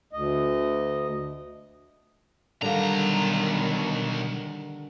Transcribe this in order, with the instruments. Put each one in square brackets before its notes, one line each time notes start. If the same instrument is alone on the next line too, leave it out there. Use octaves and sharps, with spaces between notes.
[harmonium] D2 D#5
[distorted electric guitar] B1 A#5 [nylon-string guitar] D3 G3 F5 [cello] D#3